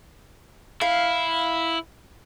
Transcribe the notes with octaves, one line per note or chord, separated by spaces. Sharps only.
E4 F5